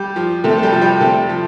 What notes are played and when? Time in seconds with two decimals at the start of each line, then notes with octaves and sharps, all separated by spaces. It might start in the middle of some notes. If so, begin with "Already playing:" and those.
Already playing: G3 G4
0.16 F3
0.44 C3 A3 A4
0.58 A4
0.63 G3 G4
0.73 F3
0.81 G3 G4
1.01 C3 A3 A4
1.29 F3